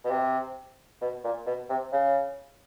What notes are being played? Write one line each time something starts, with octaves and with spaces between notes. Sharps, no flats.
B2
C3
B2
A#2
B2
C3
C#3